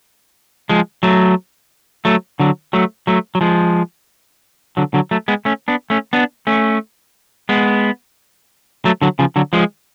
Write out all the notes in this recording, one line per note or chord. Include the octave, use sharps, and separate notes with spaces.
F3 G#3
F#3 A3
F#3 A3
D3 F#3
F#3 A3
F#3 A3
F#3
F3 G#3
D3 F#3
D3 F#3
F#3 A3
G#3 B3
A3 C#4
B3 D4
A3 C#4
B3 D4
A3 C#4
G#3 B3
F#3 A3
D3 F#3
C#3 F3
D3 F#3
F3 G#3